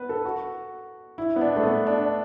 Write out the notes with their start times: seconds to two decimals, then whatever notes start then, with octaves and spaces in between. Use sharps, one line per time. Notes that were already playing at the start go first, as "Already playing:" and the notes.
Already playing: B3 B4
0.09 A4
0.25 F#4
1.18 E4
1.36 B3
1.41 D4
1.56 A3
1.63 B3
1.87 D4